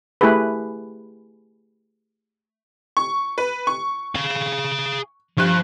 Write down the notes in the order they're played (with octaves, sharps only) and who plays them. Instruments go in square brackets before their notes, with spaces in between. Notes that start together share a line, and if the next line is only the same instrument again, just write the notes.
[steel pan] A3 E4 G4 G#4 B4
[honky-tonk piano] C#6
B4
C#6
[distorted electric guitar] G#4 F5
[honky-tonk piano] G2 F#6 [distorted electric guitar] F3